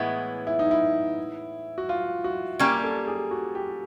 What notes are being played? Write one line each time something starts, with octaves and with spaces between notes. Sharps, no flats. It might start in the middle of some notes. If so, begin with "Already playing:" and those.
Already playing: A2 E3 G#3 B3 E4
E4
D#4
E4
F#4
F4
F#4
G3 A#3 C#4 G4
A4
G#4
F#4
G4